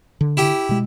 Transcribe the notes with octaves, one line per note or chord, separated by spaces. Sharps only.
D3
E4 G4 G5
B2 G#3